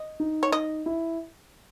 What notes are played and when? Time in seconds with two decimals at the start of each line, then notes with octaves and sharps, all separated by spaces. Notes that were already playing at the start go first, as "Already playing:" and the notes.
Already playing: D#5
0.20 D#4
0.43 C#5
0.52 D#5
0.86 E4